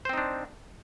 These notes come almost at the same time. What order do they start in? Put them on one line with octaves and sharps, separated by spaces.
C5 C4 D#4 D4